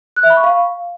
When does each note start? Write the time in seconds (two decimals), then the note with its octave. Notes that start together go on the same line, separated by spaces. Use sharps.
0.16 F#6
0.23 E5
0.30 B5
0.37 C#6
0.44 F5